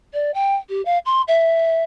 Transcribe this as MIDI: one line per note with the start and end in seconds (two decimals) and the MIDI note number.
0.13 0.31 74
0.34 0.55 79
0.69 0.81 67
0.85 0.98 77
1.05 1.22 84
1.28 1.83 76